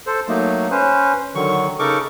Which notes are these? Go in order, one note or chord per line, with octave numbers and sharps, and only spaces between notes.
A4 C5
F#3 A3 A#3 D#4
C#4 B4 C5
D3 D#3 F#3 C#6
C#3 D#4 A4 A#4 C#6 D6